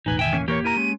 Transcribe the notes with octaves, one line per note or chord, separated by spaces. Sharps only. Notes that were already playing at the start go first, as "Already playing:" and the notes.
E1 A1 D#4 B4 G#5
D#3 E5 G5 G#5
E3 A#3 C#4
E3 A#3 G4 A#4 C#5 C#6
E4 A#4 A#5 D#7
G#3 C#4